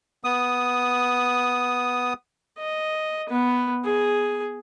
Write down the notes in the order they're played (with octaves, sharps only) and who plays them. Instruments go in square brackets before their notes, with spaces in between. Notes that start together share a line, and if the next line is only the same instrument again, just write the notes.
[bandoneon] B3 D#6
[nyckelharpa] D#5
B3
G#4